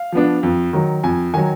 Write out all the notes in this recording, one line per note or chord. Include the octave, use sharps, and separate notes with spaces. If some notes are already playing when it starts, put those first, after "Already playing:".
Already playing: F5
F3 B3 D4
F2
D#3 F#3
F2 G#5
D#3 F#3 G#5